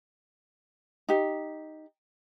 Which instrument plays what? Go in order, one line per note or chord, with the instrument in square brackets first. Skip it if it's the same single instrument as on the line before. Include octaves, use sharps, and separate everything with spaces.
[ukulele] D#4 G4